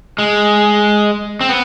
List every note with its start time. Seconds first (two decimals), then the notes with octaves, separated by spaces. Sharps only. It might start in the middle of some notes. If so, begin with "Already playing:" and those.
0.18 G#3
1.41 C4
1.49 B3